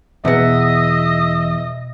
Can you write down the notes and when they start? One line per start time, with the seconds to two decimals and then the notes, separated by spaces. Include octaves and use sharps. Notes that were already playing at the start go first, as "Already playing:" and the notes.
0.25 E2 B2 B3 D#5 E5